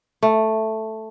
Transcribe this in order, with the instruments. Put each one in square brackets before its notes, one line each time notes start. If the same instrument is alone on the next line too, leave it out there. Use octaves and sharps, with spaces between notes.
[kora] A3